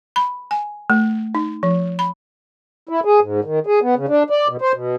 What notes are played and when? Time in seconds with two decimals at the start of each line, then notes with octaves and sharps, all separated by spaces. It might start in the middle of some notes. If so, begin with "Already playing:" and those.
0.16 B5
0.51 G#5
0.90 A3
1.35 D#4
1.63 F3
1.99 B5
2.89 E4
3.05 G#4
3.20 G#2
3.44 D#3
3.67 G#4
3.82 B3
3.96 C#3
4.09 D4
4.30 D5
4.48 B2
4.61 C5
4.73 B2